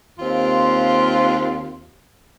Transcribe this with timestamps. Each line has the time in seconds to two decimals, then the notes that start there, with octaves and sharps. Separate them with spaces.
0.18 D#2 C4 F4